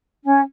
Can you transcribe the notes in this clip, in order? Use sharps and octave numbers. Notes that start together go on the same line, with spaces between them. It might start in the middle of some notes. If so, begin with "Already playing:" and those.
C#4